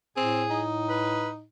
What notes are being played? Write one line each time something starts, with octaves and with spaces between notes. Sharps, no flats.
A2 C4 G#4
D#4
B4